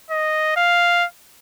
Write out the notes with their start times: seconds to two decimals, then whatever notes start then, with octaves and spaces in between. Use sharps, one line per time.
0.11 D#5
0.57 F5